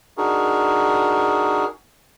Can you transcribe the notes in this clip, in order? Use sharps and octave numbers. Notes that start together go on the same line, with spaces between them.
D4 D#4 F#4 G#4 A#4